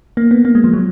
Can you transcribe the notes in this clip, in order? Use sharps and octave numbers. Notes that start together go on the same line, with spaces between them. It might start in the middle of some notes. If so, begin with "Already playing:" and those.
A#3
B3
A#3
G#3
F3
F#3